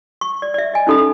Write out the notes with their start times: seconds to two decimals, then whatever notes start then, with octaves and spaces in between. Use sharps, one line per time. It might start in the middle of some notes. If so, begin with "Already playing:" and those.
0.21 C#6
0.42 D5
0.54 D5 E5
0.74 D#5 G#5
0.87 C#4 D#4 A4 B5 D#6